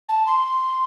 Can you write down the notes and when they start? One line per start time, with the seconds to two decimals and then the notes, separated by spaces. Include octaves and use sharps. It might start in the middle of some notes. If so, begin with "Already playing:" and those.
0.08 A5
0.26 C6